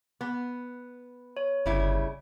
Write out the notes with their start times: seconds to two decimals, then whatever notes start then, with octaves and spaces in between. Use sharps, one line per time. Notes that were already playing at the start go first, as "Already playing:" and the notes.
0.21 B3
1.37 C#5
1.66 G1 C#3 G3 E4